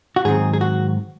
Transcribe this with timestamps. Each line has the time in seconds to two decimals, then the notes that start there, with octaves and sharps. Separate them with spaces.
0.16 F#4
0.25 G#2 D#3 F#3 C4 G#4
0.53 G#4
0.61 F#4